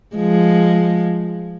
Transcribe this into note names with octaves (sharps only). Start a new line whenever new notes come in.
F3 G#3